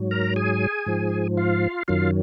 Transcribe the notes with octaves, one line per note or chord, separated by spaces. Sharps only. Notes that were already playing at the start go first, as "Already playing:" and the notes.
Already playing: G#2 F#3
A#4 A#5
G#4 G#5
G#2 F3
F4 F5
F#2 D#3 F#3 F4 F5